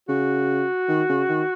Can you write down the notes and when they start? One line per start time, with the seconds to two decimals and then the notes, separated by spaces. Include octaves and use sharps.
0.08 C#3 F#4
0.88 D#3
1.09 C#3
1.28 D#3